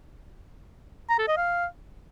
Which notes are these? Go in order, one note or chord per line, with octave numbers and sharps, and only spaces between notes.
A#5
A4
D#5
F5